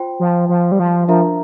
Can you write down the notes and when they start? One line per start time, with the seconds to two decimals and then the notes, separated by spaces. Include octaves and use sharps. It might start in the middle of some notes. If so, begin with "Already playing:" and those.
Already playing: F4 C5 G5 C6
0.20 F3
0.49 F3
0.72 G3
0.79 F3
1.08 F3 D4 F4 A#4 E5 A#5